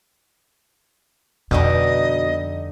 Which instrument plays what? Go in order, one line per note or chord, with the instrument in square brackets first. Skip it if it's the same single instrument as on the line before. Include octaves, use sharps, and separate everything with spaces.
[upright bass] F2 [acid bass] B2 [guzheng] D3 G3 D#4 [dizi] D#5